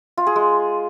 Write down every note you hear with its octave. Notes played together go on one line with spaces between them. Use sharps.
F4
G#4
G#3